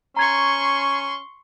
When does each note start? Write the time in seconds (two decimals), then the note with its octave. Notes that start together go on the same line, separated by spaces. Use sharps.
0.16 C#4 A#5 C6 C#6 G#6